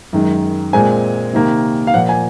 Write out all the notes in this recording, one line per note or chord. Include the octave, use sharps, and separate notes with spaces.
F#2 D#3 G#3
A#2 G#3 C4 G#5
C3 D#3 A#3
F5
A#2 F3 A#3 F#5
G#5